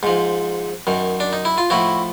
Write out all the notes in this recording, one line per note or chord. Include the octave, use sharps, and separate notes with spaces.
G#2 F3
F#2 D#3
D4
D#4
E4
F4
A2 F3 E4 F#4